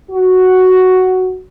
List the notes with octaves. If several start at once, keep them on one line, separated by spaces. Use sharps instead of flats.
F#4